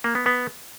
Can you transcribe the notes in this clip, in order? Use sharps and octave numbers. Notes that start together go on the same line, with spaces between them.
A#3
B3
B3